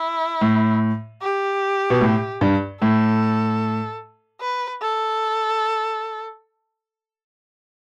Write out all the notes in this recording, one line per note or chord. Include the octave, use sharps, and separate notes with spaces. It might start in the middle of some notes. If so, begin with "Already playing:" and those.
Already playing: E4
A2
G4
B2
A2
G2
A2 A4
B4
A4